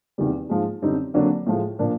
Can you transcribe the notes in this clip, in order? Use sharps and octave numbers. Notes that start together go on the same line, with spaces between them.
E2 C3 D#3 G3
G#2 F3 G#3
F#2 D3 G3 C4 D#4
F2 D3 F#3 A#3 D4
A2 F3 G#3
A#2 F3 A#3 D4